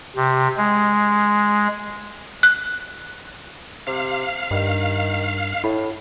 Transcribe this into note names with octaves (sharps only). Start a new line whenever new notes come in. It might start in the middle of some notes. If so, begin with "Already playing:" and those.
C3
G#3
F#6
C3 F5
G2 D#3
A2 E4